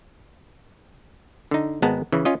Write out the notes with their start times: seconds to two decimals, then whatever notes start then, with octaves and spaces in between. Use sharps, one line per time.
1.51 D3 D#4
1.82 G#1 G#3 B3 A5 A#5
2.12 C#3 E3
2.25 C#4 F4 D#5